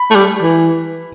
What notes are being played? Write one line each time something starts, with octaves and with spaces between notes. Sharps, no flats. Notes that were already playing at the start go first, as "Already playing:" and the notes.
Already playing: B5
A3
G3
E3